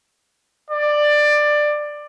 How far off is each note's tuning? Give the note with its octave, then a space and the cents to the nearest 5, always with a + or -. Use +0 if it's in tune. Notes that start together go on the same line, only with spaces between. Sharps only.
D5 +15